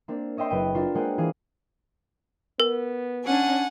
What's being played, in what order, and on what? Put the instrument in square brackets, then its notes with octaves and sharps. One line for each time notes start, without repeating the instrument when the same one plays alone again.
[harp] A#3 C4 D4
C#5 D#5 E5 G5 C6
F#1 B4 G5 D#7
D4 F4 A#4
G#3 A#3 G#4 C5 F#5 G5
E3 G#4 F5
[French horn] B3 [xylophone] A#4
[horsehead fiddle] C#4 D4 [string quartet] F#5 G#5